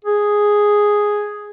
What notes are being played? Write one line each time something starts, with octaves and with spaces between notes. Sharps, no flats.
G#4